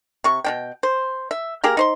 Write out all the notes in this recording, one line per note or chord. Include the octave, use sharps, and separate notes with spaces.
C3 C#6
B2 D4 G5
C5
E5
A#3 G4 G#4 A#4
D#4 C5 C6